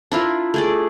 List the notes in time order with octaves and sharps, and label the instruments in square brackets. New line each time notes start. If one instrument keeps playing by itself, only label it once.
[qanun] D4 E4 F4 A#4
A3 G#4 D5